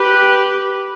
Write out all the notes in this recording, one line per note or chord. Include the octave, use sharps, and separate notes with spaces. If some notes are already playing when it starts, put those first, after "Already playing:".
Already playing: G4 B4